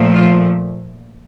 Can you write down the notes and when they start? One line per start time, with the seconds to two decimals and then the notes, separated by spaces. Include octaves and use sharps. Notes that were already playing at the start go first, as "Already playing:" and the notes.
Already playing: A#2 F3 A3
0.14 F4